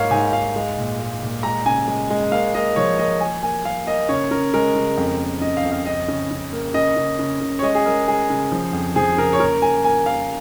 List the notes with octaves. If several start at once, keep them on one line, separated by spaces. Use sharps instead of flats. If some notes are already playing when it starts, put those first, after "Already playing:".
Already playing: G#2 A#3 C#5 F5
G#2 G#5
G#2 F5
G#3
A#2
G#3
A#2
G#3 A#5
C#3 G#5
G#3
G#3
A#3 F5
A#3 D#5
F3 C#5
A#3 D#5
A#3 G#5
A#3 G#5
A#3 F5
A#3 D#5
C#3 C#5
C#3 A#4
G#3 A#4
C#3
F2
A#3
C#3 D#5
F5
F2
F5
C#3 D#5
C#3
C#3
A#3
C#3 D#5
C#3
C#3
C#3
C#5
G#3 D#5
G#4
G#3 A#4
G#3 G#4
C#3
F3
F2
F3 G#4
C#3 A#4
C#5
A#3 A#4
A#3 G#5
A#3 G#5
A#3 F5